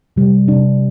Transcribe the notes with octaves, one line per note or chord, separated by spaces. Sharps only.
C3 G3
C3 G3 D4